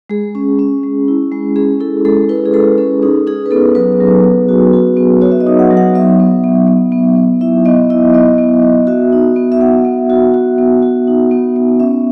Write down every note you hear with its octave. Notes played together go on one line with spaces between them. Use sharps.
G#3 G#4
C#4
C#4
G#3
E4
G#3
C#4 G#4
E4 A4
G#3 A4
E4 B4
G#4
G#3 A4
C#4 A4
D#4 G#4
D#4 G#4
B4
B3 A4
F#3 B4
F#3
B3
F#4
F#4
B3
F#4 C#5
E5
D#5
D#4
F#5
F#3
F#5
B3 E5
B3
B3
B3
B3
B3
E4 E5
B3 D#5
E4 D#5
B3 D#5
B3
B3
F#4 E5
D#4
B3
E5
B3 F#5
B3
F#4
F#4
B3
F#4
D#4
B3
B3
C#4 E5